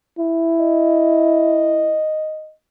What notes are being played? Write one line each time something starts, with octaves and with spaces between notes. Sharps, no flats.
E4
D#5